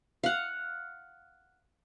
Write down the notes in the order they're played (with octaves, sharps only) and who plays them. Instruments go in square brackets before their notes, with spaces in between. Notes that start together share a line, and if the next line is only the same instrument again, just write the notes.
[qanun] F5 F#5